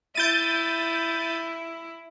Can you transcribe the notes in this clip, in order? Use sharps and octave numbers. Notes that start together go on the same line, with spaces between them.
E4 G6 A6 D#7